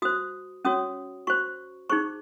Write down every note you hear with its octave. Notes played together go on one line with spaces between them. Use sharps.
F#4 C5 D#6
C#4 F#4 C#5 D#6
F#4 C5 C#6
D#4 G#4 C5 C#6